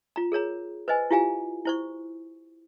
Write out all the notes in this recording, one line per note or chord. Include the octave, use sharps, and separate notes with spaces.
F4 A#5
G#4 A#4 C#5 A#5
B4 C5 D#5 G#5
E4 F4 G4 F5 G#5 A#5
E4 C5 C#6